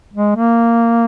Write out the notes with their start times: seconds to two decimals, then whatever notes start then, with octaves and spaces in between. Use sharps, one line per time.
0.14 G#3
0.36 A#3